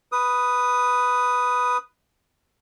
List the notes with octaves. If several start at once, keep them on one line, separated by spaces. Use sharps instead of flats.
B4 D#6